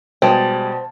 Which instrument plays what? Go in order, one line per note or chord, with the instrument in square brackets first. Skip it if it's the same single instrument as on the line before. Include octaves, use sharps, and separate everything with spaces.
[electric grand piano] B2 [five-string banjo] G3 G#3 [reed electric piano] C5 A5